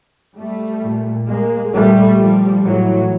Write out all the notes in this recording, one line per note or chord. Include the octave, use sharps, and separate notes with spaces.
G3 A3
A#2
G#3 A#3
A#2 G3 A3
F3 G3
A2 E3 F#3